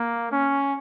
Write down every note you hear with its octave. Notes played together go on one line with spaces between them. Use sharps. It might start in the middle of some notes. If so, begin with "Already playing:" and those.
Already playing: A#3
C#4